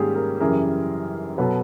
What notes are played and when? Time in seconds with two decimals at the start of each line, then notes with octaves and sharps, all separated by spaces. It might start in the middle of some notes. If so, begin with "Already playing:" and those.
Already playing: G#2 D#3 G3 A#3 C#4 G4 G#4
0.15 G#4 A#4
0.40 F#2 C#3 E3 G3 G#4 A#4
1.38 B2 F#3 A4 B4